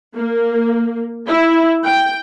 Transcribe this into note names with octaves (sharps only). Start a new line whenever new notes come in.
A#3
E4
G5